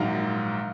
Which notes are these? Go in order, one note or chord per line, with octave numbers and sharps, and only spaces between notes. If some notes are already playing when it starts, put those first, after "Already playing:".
Already playing: A#1 G#2 D#3 F#3 F5